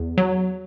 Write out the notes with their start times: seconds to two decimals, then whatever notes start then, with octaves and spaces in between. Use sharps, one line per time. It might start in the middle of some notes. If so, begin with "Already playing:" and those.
Already playing: E2
0.18 F#3